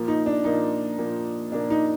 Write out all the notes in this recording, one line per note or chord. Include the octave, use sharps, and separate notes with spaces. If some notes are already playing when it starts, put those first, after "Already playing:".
Already playing: A#2 F3 A#3
D#4
D4
A#2 F3 A#3 D#4
A#2 F3 A#3
A#2 F3 A#3 D4
D#4